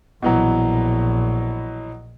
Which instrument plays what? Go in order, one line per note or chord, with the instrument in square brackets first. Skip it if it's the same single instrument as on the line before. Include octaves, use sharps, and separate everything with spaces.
[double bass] A#1 [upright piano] B2 E3 F#3